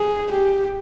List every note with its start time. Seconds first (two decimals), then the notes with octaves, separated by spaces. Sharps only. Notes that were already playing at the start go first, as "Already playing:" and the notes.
Already playing: G#4
0.31 G4